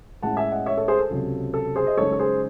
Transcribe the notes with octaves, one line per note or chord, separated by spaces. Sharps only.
A2 G#3 C#4 E4 F#5 A5
E5 G#5
D#5 F#5
C#5 E5
A4 C#5
G#4 C5
A4
C#2 C3 F#3
A4
G#4 C5
D#5
F#2 C#3 G#3 D#4 A4 C#5
A4
G#4 C5